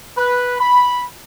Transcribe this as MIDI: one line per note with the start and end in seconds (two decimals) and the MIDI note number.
0.18 0.57 71
0.60 1.03 83